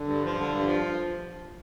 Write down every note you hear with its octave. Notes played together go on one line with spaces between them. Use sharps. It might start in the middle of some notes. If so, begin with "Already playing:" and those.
Already playing: D3
G2
F3
D3
G2
F3